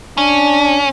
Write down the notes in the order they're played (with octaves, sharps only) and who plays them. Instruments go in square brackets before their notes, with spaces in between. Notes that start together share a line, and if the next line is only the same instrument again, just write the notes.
[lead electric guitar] C#4 [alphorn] D4